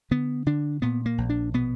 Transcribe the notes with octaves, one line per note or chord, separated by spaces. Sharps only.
D3 B3
D3 D4
A#2 B3
A#3
A#1
D4
B2 B3